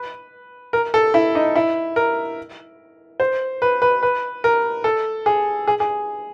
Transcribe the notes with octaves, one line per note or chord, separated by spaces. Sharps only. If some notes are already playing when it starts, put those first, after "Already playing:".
Already playing: B4
A#4
A4
E4
D#4
E4
A#4
C5
B4
B4
B4
A#4
A4
G#4
G#4
G#4